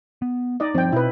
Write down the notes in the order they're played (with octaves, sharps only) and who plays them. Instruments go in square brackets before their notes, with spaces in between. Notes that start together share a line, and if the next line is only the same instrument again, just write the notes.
[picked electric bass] B3
[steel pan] D#4 D5 D#5
[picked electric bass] G2 F3 [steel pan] C4 G5
[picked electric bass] B2 [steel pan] E4 B4